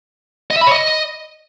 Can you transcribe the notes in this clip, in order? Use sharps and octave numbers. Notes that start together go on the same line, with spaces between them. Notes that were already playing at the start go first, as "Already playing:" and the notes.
D#5
E5
B5
C#5
D#5